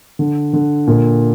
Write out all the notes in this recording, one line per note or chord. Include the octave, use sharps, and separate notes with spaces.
D3
D3
A#2